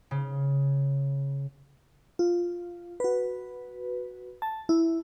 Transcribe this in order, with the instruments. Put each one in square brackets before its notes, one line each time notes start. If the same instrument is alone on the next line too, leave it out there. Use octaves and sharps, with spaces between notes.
[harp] C#3
[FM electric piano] F4
F#4 B4
A5
E4